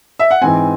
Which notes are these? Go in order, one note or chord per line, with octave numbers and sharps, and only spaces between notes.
E5
F#5
G#2 E3 C4 G#5